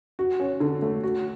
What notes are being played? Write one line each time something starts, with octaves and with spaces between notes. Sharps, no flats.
F#4
C#4
D3
A3
F#4